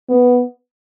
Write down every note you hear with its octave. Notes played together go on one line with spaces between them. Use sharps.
B3